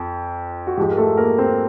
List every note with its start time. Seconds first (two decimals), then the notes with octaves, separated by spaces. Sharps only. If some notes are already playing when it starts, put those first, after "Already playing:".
Already playing: F2
0.67 F#4
0.77 G#2 F3 G#3 G4
0.91 A#4
0.97 A3 A4
1.18 A#3 A#4
1.38 C4 C5